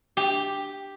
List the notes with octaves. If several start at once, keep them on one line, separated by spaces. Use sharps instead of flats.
G4